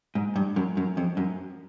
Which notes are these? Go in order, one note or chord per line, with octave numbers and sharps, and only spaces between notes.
G#2
G2
F#2
F#2
F2
F#2